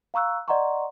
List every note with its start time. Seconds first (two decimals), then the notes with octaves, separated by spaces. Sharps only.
0.14 F5 A#5 C#6 E6 F#6
0.48 D5 D#5 F#5 A#5 C6 C#6